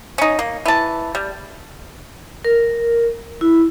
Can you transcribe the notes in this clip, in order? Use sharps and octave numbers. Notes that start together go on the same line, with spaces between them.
C#4 D#4
A#3
E3 A5
G3
A#4
E4